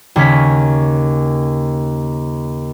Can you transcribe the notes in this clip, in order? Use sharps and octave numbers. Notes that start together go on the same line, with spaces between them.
D#2 C#3 C#4 B6